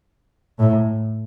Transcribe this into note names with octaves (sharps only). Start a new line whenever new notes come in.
A2